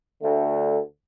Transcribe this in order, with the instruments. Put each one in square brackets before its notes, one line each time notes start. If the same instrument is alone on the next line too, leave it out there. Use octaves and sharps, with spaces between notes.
[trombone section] D2 D3 A3